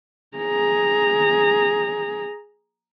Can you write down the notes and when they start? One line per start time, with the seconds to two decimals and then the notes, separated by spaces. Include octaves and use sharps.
0.37 G#4 A#5